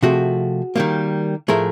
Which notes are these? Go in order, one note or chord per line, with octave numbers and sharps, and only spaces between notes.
C3 F3 A3 F#4 G#4
D#3 G3 A#3
A2 F3 A3 G#4 A#4